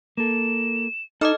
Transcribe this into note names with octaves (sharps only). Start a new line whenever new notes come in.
A#3 A4 E7
D#4 A4 D#5 D6 F6 E7